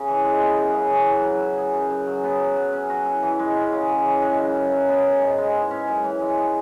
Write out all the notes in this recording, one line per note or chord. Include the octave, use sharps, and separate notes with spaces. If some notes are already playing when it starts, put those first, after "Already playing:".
Already playing: C#3
E3
G#3
B3
F#2
C#3
E3
F#3
F#3
E4
G#4
F#2
F#2
F#3
B3
F#3
F#3
C#4
F#4
E4
E3
G#3
C#4
C#3
C#3
E3
G#3
F#2
F#2
F#3
B3
G#4
G#2
G#3
E4
C#4
F#2
E3
G#3
B3